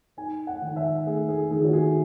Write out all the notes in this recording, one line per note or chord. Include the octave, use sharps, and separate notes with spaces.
D#4 G#5
F#5
D#3 F#5
E5
A3 G#4
G#4
D#3 G#4
F#4
G#4